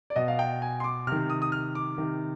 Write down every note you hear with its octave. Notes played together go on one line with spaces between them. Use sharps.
D5
B2 D#5
F5
G5
G#5
C6
D6
C3 D#3 F6
D#6
D#6
F6
D6
C3 D#3